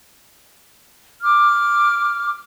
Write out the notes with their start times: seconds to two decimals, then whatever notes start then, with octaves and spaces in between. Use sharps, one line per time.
1.22 D6 F6